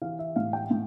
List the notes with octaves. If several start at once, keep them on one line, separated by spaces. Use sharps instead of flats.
E3 F5
E5
A2 F5
G5
A2